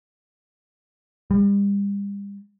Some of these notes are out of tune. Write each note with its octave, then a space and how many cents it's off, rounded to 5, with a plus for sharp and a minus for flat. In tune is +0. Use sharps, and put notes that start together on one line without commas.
G3 +40